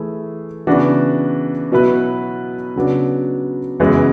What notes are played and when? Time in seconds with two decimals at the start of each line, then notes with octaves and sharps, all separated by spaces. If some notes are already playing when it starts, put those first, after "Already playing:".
Already playing: E3 A3 E4 G#4
0.67 C#3 E3 B3 D4 F#4
1.72 B2 F#3 B3 E4 B4
2.76 C#3 F#3 B3 D4
3.80 F#2 C#3 E3 G#3 B3